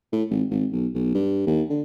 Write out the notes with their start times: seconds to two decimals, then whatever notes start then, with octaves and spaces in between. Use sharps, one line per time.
0.12 A2
0.30 G#1
0.50 G#1
0.72 B1
0.94 B1
1.15 G2
1.47 D#2
1.70 D3